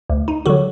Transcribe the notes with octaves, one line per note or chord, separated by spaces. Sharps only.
D2
D#4
D3 F#3 F#4